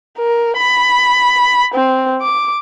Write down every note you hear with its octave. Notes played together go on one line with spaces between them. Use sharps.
A#4
B5
C4
D6